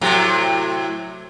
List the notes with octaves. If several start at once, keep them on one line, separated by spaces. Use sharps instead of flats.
A2 C3 F#3